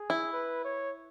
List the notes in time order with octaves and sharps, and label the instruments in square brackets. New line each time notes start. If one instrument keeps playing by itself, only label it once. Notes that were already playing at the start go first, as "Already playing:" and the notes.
Already playing: [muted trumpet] G#4
[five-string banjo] E4
[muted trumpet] B4
C#5